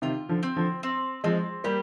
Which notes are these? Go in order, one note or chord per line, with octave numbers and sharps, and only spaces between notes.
C3 D#3 F4
D3 F3
C4
D3 F3
C4
F3 G#3 C4
G3 A#3 G4